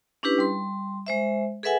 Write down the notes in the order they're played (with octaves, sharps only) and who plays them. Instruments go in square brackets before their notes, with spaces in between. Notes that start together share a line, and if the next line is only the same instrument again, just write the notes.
[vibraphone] C#4 D4 E4 G4 B4
G3 C6
G#3 C5 E5
G#4 A4 B4 E5 F#5 G#5